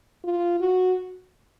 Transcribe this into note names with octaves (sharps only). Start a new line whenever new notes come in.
F4
F#4